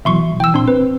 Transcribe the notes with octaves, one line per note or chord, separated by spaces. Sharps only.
B2 E3 F#3 E5 C6 C#6
E3 G5 E6
A#2 C4 D4 C6
C4 B4